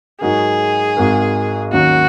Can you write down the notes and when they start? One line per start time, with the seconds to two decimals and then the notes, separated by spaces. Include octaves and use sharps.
0.21 G#2 F#3 D#4 F#4 G#4 A#4
0.97 G#1 G#2 G#3 F#4 A#4
1.72 D#2 D#3 F#3 C#4 F#4